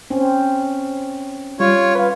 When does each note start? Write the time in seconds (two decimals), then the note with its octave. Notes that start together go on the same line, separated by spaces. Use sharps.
0.10 C4 C#4
1.60 G3 F4 C#5
1.95 B4 F5